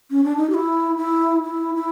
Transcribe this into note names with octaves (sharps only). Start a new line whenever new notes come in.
C#4
D4
D#4
G4
E4
E4
E4
E4